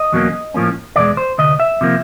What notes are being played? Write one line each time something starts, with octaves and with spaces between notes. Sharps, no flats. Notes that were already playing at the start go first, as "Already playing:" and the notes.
Already playing: D#5
E2 B2 F#3 A#3 C#4
A2 F3 A#3 C#4
E2 B2 G#3 D5
C5
D2 C3 D#5
E5
C3 F3 A#3